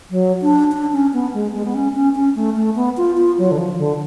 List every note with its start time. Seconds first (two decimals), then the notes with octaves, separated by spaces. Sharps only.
0.10 F#3
0.42 D4
0.72 D4
0.93 C#4
1.13 B3
1.34 G#3
1.53 G#3
1.65 B3
1.74 C#4
1.95 C#4
2.15 C#4
2.36 A3
2.56 A3
2.76 B3
2.97 F4
3.18 F4
3.38 F#3
3.51 D3
3.58 F3
3.79 D3